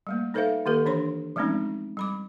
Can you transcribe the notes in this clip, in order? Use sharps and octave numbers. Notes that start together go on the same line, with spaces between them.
G3 A3 A#3
D#4 A4 B4 C5 E5 F5
D#3 A#3 G4 A4 B4
E3 D4 C#5 C6
F3 G#3 A3 C4 C#4 D#4
G3 B5 D6